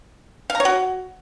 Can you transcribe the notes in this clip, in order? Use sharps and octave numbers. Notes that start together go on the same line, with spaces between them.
F5
A#5
C#5
F#4